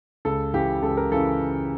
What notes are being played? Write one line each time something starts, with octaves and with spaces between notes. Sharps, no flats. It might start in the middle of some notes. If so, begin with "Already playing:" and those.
C#2 A4
C#3 E3 G4
C#2 A4
A#4
C#3 E3 A4